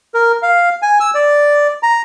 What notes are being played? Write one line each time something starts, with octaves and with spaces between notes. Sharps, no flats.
A#4
F5
G#5
E6
D5
A#5